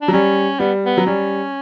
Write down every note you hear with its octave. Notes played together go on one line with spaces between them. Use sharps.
D4
F#3
G3 C#4
G3 B3
B3
F#3
G3 C#4